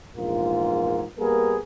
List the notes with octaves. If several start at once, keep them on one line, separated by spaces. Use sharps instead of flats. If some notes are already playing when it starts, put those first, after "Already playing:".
A#1 E2 G#2 F4 A#4
G3 A#3 B3 G#4 A#4